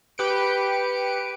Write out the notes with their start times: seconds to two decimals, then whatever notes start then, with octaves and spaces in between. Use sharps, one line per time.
0.18 G4 B4 C#7 D7